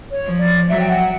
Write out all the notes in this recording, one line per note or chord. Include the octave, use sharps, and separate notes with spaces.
C#5
F3
D5
F#3 E5
G5
F#5